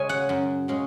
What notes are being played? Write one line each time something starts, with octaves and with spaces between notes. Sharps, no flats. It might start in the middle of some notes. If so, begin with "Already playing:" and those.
Already playing: C#3 G#3 C#4 G#5
F#5
F#2
C#3 G#3 C#4